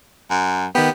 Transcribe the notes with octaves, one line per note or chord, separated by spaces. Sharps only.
F#2
D#3 B3 G4